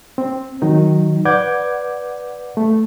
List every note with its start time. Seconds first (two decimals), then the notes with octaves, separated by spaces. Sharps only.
0.18 C4
0.62 D#3 F#3 D#4
1.25 B4 D5 F#5 D6 G6 G#6
2.57 A3